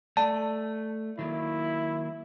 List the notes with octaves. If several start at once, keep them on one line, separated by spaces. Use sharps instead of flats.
A3 D5 A5
D#3 F#3 A#3 E4